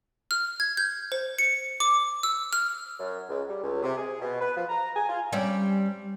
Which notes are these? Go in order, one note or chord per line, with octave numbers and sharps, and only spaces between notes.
F6
G#6
G6
C5
C#7
D6
E6
F6
F#2
C#2
G3
C#2
C3
G#4
B2
B4
F3
A#5
G#5
F4
G3 C4 C#4